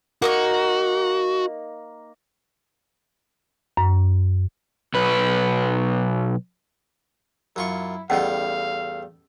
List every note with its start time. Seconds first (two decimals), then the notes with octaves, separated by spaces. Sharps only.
0.22 A#3 D#4 F#4 C#6
3.77 F#2
4.94 B1 B4
7.56 F#2 E4 F4 C#6
8.10 E2 A2 G3 C#4 D#5 F5 F#5